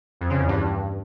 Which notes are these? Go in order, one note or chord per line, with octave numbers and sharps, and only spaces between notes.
F2
C#3
E2
G2